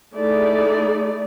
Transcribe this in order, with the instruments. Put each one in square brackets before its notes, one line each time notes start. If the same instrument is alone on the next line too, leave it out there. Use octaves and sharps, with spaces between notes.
[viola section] A3 D#4 E4 G#4 D5